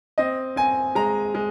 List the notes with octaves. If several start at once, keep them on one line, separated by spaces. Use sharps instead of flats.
C4 D#5
C4 G#5
G#3 A#5
G#3